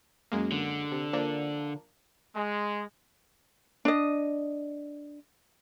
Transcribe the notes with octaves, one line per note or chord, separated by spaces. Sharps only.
F#2 G#3 A#3
D3
C3
F3 A#3 D4
G#3
D4 D#5